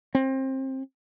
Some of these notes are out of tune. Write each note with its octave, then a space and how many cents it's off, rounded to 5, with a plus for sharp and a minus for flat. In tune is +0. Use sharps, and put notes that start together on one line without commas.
C4 +25